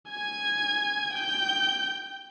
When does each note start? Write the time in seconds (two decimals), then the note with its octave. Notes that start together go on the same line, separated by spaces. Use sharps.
0.10 G#5 G#6
1.14 G5 G6